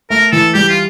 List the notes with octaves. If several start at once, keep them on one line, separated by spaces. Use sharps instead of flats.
A3 A#4
E3 A4
G3 G4
F4